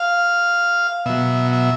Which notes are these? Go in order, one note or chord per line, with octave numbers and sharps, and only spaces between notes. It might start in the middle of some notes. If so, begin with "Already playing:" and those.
Already playing: F5
B2 F#3 E5
E5